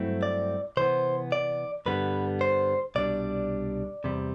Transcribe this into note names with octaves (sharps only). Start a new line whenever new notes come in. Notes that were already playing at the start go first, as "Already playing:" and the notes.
Already playing: G2 F#3 A3 C4 E4
D5
C3 E3 B3 C5
D5
G2 D3 G3 B3 B4
C5
C2 B2 G3 D4 D5
E2 C3 G3